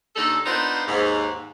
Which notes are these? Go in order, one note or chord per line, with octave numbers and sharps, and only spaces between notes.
D#2 D4 D#4 A4
B3 D4 D#4 F4 A#4 C5
D#2 G#2